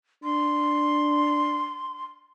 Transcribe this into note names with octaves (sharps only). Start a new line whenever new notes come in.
D4 C6